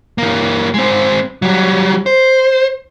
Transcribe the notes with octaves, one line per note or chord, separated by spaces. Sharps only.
E3 A#3
G#3 C4
F#3 G3
C5